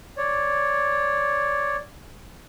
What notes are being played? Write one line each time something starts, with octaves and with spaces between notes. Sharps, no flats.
C#5 D5